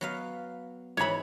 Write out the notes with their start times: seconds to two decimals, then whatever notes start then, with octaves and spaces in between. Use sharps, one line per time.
0.01 F#3 B3 F5
0.97 G#2 E3 C#5 E5 B5